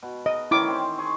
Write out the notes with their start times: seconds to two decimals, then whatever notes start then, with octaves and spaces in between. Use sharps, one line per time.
0.02 B2
0.26 D#5
0.51 D#3 C#4 E4 C6 D6
0.68 C4 C5
0.98 G#4 D#5 C#6